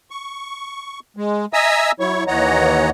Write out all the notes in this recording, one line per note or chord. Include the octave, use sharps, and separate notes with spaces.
C#6
G#3
D#5 E5 G#5 A#5 D#6 E6
F#3 E4 C#5 C#6
D#2 E3 C#5 D#5 F#5 A#5